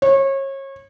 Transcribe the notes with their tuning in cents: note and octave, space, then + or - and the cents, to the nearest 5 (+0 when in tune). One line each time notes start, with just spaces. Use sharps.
C#5 -30